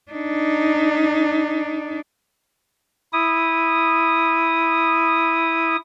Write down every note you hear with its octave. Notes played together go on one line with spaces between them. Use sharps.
D4 D#4
E4 D#6